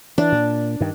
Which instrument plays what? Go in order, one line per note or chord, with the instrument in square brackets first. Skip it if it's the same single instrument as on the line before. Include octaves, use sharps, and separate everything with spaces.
[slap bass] E3 [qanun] D4
[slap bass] A#2
G2 D#3